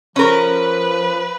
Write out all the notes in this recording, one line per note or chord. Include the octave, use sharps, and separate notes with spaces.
F3 C#4 A#4 B4